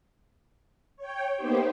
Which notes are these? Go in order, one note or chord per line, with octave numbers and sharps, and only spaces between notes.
C#5 G5
A#3 B3 D#4 G4 C5